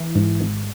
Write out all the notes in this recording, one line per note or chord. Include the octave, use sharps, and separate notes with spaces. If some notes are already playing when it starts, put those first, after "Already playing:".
Already playing: E3
G#2
G#1